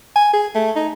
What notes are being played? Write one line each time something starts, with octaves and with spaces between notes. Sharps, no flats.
G#5
G#4
A3
D#4